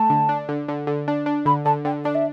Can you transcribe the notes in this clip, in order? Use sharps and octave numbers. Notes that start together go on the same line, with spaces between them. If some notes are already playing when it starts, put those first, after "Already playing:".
Already playing: A3 A5
D3
D4
D3
D3
D3
D4
D4
D3 B5
D3 A5
D3 G5
D4 D5
E5